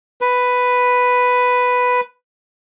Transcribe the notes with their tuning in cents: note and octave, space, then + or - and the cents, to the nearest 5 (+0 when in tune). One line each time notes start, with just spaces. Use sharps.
B4 +5